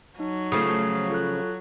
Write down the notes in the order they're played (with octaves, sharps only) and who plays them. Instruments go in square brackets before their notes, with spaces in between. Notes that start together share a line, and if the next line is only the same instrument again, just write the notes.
[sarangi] F#3 [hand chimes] D#4
[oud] C#3 F3 A3 [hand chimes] D#6 C7
[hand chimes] F4 A4 F#6